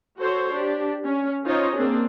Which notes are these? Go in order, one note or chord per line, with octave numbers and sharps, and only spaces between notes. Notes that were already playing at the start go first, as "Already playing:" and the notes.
F#4 A4 C5 C#5
D4 G4
C#4
C#4 D#4 F4 C5 C#5 D#5
A#3 C4 D4 G#4